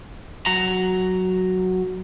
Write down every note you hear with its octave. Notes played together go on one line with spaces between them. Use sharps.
F#3 A#5